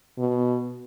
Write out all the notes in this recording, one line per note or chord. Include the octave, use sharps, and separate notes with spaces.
B2